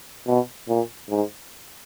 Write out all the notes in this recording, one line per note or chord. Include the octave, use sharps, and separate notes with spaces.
B2
A#2
G#2